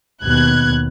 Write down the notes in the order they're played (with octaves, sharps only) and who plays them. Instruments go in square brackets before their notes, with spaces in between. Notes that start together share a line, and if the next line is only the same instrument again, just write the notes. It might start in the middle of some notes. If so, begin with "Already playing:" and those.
[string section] D#2 F#6 G#6 [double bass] B2 B3